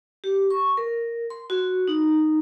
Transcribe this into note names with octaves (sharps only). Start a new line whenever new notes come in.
G4
C#6
A#4
C6
F#4
D#4